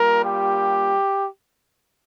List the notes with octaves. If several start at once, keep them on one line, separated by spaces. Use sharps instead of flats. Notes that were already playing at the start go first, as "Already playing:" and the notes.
Already playing: G3 A#3 F4 A#4
G4